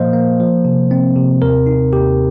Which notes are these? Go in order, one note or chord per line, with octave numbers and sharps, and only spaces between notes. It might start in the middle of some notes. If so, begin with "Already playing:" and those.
Already playing: A#2 F3 A#3 C5 D#5 F5
A#3
F3
C3
C4
C3
D#2 A#4
D#4
D#2 G4